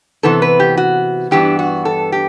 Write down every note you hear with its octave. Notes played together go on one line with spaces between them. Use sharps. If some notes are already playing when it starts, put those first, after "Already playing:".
C3 E3 B3 A4
B4
G4
F#4
G2 E3 B3 D4 G4
F#4
A4
G4